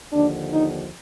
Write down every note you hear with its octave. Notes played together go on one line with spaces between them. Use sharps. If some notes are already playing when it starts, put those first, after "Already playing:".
D#2 D3 F3 D4
D#4